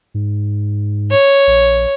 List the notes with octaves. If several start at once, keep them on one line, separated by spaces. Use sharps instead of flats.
G#2
C#5
A#1